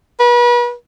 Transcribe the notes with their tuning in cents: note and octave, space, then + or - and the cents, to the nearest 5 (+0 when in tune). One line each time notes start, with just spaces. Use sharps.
B4 -40